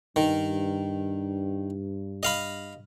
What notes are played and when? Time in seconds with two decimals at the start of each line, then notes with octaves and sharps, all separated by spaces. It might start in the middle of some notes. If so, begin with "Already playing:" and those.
0.16 G2 D#3
2.23 D#5 F5 B5